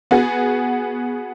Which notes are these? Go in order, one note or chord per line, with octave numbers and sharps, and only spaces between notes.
B3 F#4 G#4